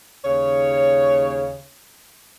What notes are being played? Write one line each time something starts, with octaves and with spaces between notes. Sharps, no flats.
D#2 C#3 C#5